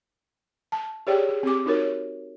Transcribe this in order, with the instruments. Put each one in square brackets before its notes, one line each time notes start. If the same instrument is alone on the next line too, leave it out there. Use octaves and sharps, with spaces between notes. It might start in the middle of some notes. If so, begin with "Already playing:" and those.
[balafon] A5
G4 G#4 C#5 D5 G5
G#4
C4 G4 D6
D#4 F#4 A#4 C#5